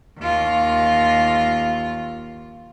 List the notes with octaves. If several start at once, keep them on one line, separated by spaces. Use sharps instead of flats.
D#2 F4